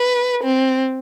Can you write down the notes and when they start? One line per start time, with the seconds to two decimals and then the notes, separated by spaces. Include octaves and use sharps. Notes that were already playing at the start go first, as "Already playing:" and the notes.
Already playing: B4
0.44 C4